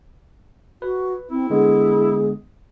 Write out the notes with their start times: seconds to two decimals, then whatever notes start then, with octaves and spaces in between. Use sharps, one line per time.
0.82 F#4 B4
1.31 C4 E4
1.50 D3 G#3 B3 G#4